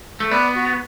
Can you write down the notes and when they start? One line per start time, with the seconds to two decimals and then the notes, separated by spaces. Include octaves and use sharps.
0.20 A3
0.31 B3 B4 D5
0.56 F#4